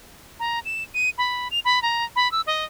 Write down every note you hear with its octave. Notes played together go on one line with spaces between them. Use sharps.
A#5
E7
D#7
B5
F7
B5
A#5
B5
E6
D#5